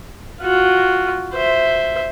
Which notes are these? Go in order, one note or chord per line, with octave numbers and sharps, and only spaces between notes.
F4 F#4
C5 E5